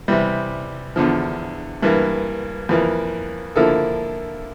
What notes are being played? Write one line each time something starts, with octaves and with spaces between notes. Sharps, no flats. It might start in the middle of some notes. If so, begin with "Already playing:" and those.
C3 E3 G3
E2 D3 F3
G2 E3 A#3
F2 E3 A#3
D3 F3 A#3 E4 A4